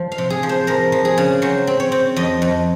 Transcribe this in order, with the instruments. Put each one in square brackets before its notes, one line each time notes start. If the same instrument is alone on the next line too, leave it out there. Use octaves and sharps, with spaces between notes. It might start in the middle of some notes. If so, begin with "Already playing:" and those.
Already playing: [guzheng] F3
F5
C3
G#4
F3
C5
F3 A#4
F3
G#4
C#3
F#3 C5
C4
C#5
C4
F2 D#5
F2